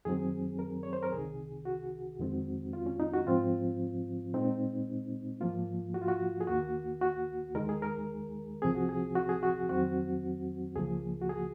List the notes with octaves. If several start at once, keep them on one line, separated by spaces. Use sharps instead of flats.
F#2 D#3 F#3 C4 G#4
A#4
C#5
C5
A#4
C2 C3 D#3 G#4
F#4
F2 D#3 G#3 C4
F4
C#4
D#4
F#4
G#2 F3 C4 F4
A#2 G#3 C4 D#4
G#2 F3 A#3 F4
F#4
F4
F#4
G#4
D#2 D#3 A#3 F#4
F#4
D#2 D#3 G#3 A#4
G#4
A#4
C2 C3 F3 C4 G#4
F#4
G#4
F#4
G#4
F#4
F2 D#3 F#3 C4 F#4
C#2 C#3 F3 A#3 G#4
F#4
G#4